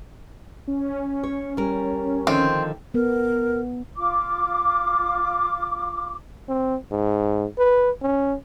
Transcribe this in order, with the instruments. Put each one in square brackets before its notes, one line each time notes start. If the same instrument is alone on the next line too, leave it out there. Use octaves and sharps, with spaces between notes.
[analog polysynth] C#4
[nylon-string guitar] C#5
G3 A#4
[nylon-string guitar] D3 D#3 F3 [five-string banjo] C4
[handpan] B3 [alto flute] A#4
[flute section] F4 D6
[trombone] C4
G#2
B4
C#4